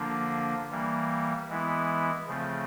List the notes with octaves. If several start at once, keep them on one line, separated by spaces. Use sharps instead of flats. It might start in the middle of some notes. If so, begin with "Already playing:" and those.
Already playing: D3 F3 A#3 D4
E3 G3 A#3
E3 G#3 B3 E4
C#3 F3 A3 C4